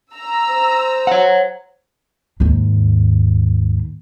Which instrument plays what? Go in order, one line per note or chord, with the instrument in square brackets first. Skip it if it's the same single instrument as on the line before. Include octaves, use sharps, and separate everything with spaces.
[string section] A#5 E6
[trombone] C5
[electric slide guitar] C#5 F#5
[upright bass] D#2 G#2